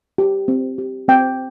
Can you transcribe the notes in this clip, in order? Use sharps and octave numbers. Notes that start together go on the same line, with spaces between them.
G4
C4
G4
C4 G5